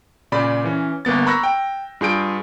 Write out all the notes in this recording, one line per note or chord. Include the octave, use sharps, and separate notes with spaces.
A#2 C#3 D5 B5
E3 C#4
G1 A#3 B3 A6
A#5 B5 C#6 E6 F#6 A#6
G5
G2 F4 G#4 G6 D7